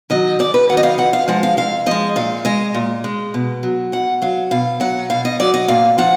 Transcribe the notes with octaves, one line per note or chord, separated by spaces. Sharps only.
D#3 F#3 D#5
G#2 D5
B4
D#3 F#3 D#5 F#5
F5
F2 F#5
F5
F3 G#3 F#5
F5
F2 F5
F3 G#3 D#5
A#2 F5
G#3 D#5
A#2
G#3
B2
F#3
B2 F#5
F#3 F5
B2 F5
F#3 F#5
B2 F5
D#5
F#3 D5
D#5
A#2 F5
F3 F#5